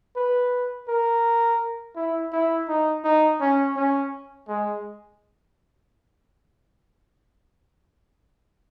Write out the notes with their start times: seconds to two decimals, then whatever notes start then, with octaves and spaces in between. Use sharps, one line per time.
0.16 B4
0.88 A#4
1.96 E4
2.32 E4
2.68 D#4
3.04 D#4
3.40 C#4
3.76 C#4
4.48 G#3